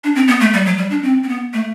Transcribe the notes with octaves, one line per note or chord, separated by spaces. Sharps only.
D4
C4
B3
A3
G3
F#3
G3
D4
C4
C4
B3
A3